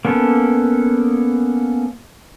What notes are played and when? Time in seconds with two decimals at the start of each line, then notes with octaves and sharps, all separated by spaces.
0.05 A#3 B3 C#4 A4